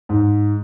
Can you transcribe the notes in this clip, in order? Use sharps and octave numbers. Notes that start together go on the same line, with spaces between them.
G#2